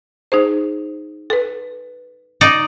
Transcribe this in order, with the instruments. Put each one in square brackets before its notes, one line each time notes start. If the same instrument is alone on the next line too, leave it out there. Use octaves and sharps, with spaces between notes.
[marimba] D#4 G#4 C5
A4 B4
[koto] D#4 D5 A#5